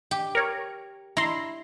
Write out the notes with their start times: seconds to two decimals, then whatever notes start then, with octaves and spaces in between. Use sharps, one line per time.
0.11 G4
0.35 A#4 C#5
1.17 E4 A#5 C6